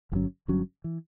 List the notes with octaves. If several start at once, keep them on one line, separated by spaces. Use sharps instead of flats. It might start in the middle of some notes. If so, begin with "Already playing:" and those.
G1 G2 F#3 C#4
G1 G2 F#3 C#4
E3